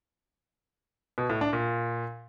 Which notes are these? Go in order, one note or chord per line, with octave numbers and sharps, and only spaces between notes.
B2
A2
D4
A#2